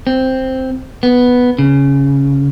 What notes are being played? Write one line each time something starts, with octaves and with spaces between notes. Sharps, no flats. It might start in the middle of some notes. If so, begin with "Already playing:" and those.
C4
B3
C#3